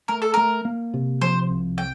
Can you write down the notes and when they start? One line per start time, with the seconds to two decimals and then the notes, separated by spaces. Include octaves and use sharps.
0.08 A3 A#4
0.22 A4
0.34 A3 A#4
0.65 A#3
0.94 C3
1.21 F3 C5
1.49 C2
1.78 G5